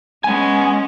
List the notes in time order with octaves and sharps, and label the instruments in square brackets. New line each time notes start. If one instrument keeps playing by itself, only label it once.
[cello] G#3 C#4 [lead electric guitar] B3 G#5